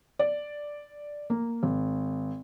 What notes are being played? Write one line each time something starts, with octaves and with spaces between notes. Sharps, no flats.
D5
A#3
G#1